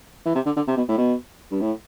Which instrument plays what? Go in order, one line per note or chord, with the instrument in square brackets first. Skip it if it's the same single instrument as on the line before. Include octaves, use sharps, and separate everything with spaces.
[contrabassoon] E3
C3
D3
D3
C3
B2
A2
B2
G2
A2